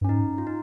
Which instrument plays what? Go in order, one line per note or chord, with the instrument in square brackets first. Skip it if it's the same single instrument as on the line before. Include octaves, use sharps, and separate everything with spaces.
[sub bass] G2
[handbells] C#4
[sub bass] G#2 [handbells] D#4
[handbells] F4
D#4